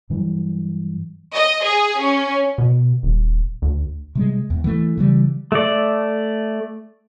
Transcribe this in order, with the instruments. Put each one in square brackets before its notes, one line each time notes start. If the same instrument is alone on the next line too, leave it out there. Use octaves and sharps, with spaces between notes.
[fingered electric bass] G2 E3 F#3 G3
[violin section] D#5
G#4
C#4
[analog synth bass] B2
D#1
D2
[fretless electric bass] C3 G3 G#3
E2
E3 A3
C#3 E3 G3
[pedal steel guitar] A3 D5